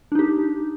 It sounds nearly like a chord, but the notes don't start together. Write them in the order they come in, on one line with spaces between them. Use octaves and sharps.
D4 D#4 G4